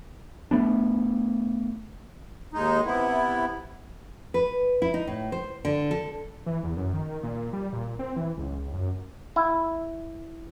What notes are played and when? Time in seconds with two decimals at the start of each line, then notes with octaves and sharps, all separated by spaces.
0.51 A3 B3 D4
2.53 D#2 G#3 D#4
2.85 C3 B3 E4
4.34 B4
4.82 E4
4.94 D#4
5.07 A2
5.32 C5
5.65 D3
5.91 A4
6.46 E3
6.63 E2
6.77 F#2
6.93 D#3
7.23 A#2
7.53 G3
7.73 A#2
7.99 C4
8.16 E3
8.38 C#2
8.73 F#2
9.36 E4